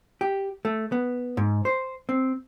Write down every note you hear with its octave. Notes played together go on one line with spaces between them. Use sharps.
G4
A3
B3
G#2
C5
C4